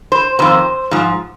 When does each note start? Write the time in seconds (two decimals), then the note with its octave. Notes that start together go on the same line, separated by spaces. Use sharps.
0.12 C5
0.39 F2 C3 D#3 C5
0.91 G#2 F3